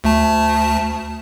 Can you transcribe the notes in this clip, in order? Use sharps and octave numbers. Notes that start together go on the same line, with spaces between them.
D2 A3 A5